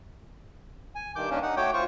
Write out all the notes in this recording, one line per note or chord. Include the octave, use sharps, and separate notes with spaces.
G#5
G2 D#3 D6 G6
D#3 A#3 C#4 D4
D#4 F#5
A3 F#4 C#5 G5 D6 G6
D2 F4 C5 C#6